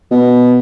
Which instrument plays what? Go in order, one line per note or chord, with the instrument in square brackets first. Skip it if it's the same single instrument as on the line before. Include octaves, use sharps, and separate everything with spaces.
[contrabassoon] B2